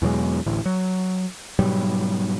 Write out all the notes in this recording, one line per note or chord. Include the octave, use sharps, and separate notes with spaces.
E2 B2 F#3 G#3
A1 D2 A2
F#3
G#2 B2 F#3 G3